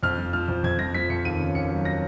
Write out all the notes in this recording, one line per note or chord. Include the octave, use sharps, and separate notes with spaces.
F2 F6
F3
F3 F6
F2
F2 G#6
F3 A#6
F3 B6
F2 C#7
D#2 D#7
C#3
D#2 C#7
F#3
A#6